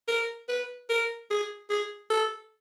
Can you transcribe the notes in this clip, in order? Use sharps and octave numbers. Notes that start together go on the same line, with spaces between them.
A#4
B4
A#4
G#4
G#4
A4